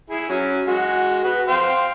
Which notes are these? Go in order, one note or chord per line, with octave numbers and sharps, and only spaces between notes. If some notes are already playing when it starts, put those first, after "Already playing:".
E4 G#4
F#3 C#4
G#3 F#4
F#4 B4
C5 F5 G5